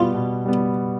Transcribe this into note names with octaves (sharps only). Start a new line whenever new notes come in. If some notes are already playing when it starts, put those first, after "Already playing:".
Already playing: B2 G3 B3 F4
B2
G3 B3